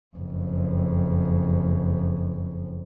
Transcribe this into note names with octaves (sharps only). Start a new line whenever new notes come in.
F#1 F2